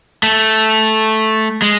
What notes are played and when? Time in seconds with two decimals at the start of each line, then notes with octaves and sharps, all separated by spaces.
0.23 A3
1.62 G#3